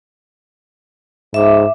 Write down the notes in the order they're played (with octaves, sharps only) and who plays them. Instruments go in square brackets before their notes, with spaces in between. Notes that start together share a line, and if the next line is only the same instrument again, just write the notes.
[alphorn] G#2 [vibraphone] E5 D6